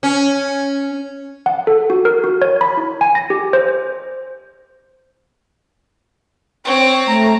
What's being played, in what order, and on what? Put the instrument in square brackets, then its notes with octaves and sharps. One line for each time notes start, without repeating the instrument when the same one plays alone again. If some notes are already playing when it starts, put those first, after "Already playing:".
[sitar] C#4
[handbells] F#5
A4
F#4
A#4
F#4
C#5
B5
E4
G#5
A#6
G4
C5
[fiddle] C4 [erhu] C#5
[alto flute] A3 [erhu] A#5